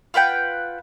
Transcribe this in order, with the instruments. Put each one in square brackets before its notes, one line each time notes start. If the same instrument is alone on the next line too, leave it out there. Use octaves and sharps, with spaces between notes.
[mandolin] F4 B4 F#5 G5